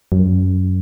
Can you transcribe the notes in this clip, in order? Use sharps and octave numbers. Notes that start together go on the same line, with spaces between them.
F#2